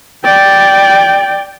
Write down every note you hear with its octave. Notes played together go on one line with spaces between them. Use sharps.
D5 G5